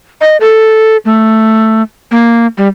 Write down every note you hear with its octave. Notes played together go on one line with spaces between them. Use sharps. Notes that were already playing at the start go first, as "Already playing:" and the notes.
D#5
A4
A3
A#3
G3